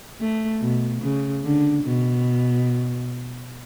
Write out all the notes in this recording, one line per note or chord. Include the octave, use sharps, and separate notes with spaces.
A3
B2
C#3
D3
B2